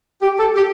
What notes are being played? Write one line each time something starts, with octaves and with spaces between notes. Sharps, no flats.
G4
A4
G4